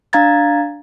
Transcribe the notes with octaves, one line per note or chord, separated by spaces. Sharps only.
D4 F5 A#5 G#6 A6